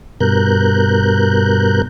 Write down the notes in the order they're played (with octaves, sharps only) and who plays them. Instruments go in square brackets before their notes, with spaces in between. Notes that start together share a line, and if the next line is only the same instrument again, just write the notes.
[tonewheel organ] G2 B2 A#4 F#6 G6